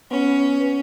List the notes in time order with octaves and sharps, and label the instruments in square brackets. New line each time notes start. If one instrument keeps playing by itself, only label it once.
[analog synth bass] B3 [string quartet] C#4